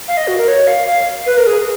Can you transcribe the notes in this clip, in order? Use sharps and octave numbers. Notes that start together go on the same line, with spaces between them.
F5
D#5
F#4
A#4
C#5
F5
F5
B4
A#4
G#4